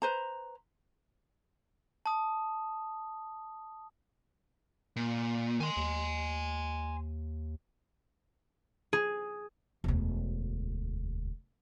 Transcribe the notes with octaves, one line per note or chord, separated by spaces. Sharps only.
B4 C5 A#5
A5 D#6
A#2
D#3 G#5 C6
D#2
G#4
E1 D2